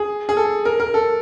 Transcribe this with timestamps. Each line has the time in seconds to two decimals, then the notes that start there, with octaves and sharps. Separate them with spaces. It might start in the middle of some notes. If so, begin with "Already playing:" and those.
Already playing: G#4
0.29 G#4
0.37 A4
0.65 A#4
0.80 A#4
0.94 A4